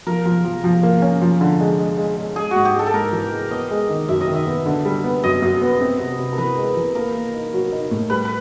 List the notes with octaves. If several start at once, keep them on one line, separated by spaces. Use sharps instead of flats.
F3 A#4
F3
F3
F3
A#3
C#4
F3
D3
G#3
G#3
G#3
G#3
G#3 G#4
G#2 F#4
G4
G#3 A4
A4
G#2 A#4
E3
G#3
B3 D#5
G#3
D#3
F#2 E5
D#5
D#3
E5
B3
D3
G3
B3
F#2 D#5
F#2
B3
C4
C3
C3
A#4
E3 B4
G#3
E3
A#3 A#4
A#3
D#4
F#3
D#4
A2
G3 B4
B4